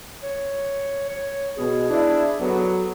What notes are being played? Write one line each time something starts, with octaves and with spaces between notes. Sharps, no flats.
C#5
C#5
B2 G#4
D4 E4
F#3 B3 A4